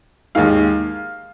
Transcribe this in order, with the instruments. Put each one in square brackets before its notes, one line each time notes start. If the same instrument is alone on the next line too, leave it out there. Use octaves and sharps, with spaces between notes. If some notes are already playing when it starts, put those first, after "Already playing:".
[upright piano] D#2 D#3 G#3 D#4 F5